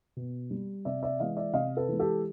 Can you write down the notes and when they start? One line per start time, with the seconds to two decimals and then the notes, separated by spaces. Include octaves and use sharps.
0.16 B2
0.50 G3
0.85 C3 D5 E5
1.03 D5 E5
1.19 E3 G#3 D#5 F5
1.37 D5 E5
1.53 C3 D#5 F5
1.77 A4 B4
1.88 E3 G#3
1.99 G4 A4